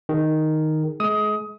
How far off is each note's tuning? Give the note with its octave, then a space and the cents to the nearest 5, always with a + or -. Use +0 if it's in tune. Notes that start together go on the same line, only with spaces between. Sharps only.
D#3 +0 G#4 +0
G#3 +35 D#6 +20